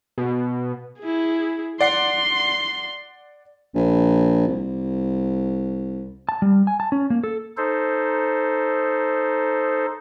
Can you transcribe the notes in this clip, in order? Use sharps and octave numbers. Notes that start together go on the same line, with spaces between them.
B2
E4 G#4
D5 F#5 C6 C7
A#1
C2
A5
G3
G#5
A5
C#4
A#3
A4
D#4 A4 C5